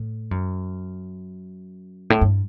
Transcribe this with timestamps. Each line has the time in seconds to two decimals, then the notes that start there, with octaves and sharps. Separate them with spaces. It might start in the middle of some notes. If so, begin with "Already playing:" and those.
Already playing: A2
0.31 F#2
2.10 A2
2.21 G2